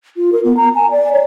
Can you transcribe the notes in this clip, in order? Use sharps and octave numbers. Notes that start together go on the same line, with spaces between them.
F4
A#4
B3
A#5
G#5
D5
C#5